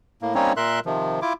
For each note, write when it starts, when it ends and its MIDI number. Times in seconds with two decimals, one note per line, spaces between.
0.22 0.35 45
0.22 0.35 58
0.35 0.53 55
0.35 0.53 58
0.35 0.53 60
0.35 0.53 61
0.35 0.53 63
0.35 0.53 73
0.57 0.80 46
0.57 0.80 70
0.57 0.80 76
0.57 0.80 84
0.57 0.80 90
0.86 1.20 48
0.86 1.20 51
0.86 1.20 53
1.22 1.33 64
1.22 1.33 65
1.22 1.33 86